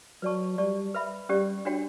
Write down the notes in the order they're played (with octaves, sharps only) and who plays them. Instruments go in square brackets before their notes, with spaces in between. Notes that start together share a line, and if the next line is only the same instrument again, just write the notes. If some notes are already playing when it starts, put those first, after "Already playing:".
[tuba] F#3 [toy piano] B4 D5 A5 C#6
[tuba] G3 [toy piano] G4 D5 A5 C#6
[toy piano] B4 E5 B5
[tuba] G3 [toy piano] C#4 G4 D5
[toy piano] D4 F#4 C#5 G5